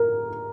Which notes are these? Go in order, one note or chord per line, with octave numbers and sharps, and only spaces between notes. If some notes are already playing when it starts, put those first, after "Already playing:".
Already playing: A#4